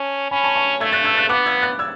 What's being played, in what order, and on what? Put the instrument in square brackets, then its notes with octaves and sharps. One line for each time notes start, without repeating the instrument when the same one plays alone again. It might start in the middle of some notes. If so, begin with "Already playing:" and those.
Already playing: [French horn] C#4 [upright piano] A5
[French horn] C#4 [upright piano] G#5 B5
[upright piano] A5 C#6
A5 C#6
[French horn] A3 [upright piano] E6 G#6
[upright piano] F#6 A6
E6 G#6
F#6 A6
[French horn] B3 [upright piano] D6 F#6
[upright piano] E6 G#6
F#6 A6
E6 G#6